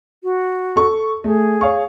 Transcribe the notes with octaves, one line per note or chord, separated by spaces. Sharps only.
F#4
A4 C#6
A3 G#4
C#5 F5 C#6